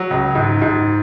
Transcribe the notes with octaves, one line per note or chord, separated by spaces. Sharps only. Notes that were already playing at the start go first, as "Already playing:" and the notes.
Already playing: F#3
C#2
G#2
G#2